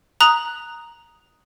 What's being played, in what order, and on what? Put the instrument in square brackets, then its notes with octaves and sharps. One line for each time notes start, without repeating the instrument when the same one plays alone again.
[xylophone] A#5 D#6 F#6 F7 F#7